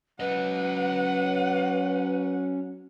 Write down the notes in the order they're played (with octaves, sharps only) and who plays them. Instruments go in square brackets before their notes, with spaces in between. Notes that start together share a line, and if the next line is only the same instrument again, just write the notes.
[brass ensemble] F#3 [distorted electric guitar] C#4 D#5 [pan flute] B4 [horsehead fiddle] F#5